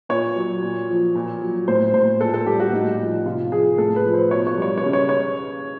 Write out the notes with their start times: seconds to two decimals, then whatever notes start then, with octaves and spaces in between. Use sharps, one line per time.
0.09 A#2 C#5
0.36 F#3
0.63 A#2
0.89 F3
1.15 A#2
1.42 F#3
1.68 A2 C5
1.93 A2 C5
2.21 A#2 A4
2.34 A4
2.46 G3 G4
2.60 F#4
2.73 A2 D#4
2.99 F3
3.26 C3 F4
3.52 F3 G#4
3.78 A2 A4
3.96 B4
4.05 F3
4.13 C5
4.31 B2 C#5
4.47 C#5
4.57 G3 C#5
4.78 C#5
4.84 C#3
4.93 C#5
5.09 C#5